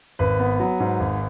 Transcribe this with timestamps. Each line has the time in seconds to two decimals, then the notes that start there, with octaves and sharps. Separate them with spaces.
0.19 G#1 B4
0.40 B3
0.60 F#3
0.80 G#2
1.00 G#1